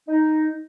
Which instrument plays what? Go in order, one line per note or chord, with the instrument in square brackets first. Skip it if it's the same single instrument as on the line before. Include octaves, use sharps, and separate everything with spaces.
[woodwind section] D#4